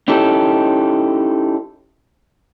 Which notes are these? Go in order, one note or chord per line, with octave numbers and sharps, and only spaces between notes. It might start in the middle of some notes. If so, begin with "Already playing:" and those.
C#4 D#4 E4 G4 A4